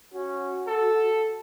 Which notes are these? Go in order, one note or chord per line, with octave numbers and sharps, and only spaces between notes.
C#4 F#4
A4